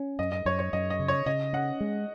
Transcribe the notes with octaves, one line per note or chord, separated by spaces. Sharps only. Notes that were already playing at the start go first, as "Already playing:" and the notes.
Already playing: C#4
F#2 D#5
D#5
F#2 C#5
C#5
F#2 D#5
D#5
C#3
C#5
C#3 D#5
C#4 F#5
G#3